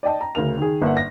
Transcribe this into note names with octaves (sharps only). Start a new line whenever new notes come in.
D5 D#5 G5 A5
A#5
D2 C#3 A#4 F7
D#3 G#4
G1 A#3 E5 F#5
A#6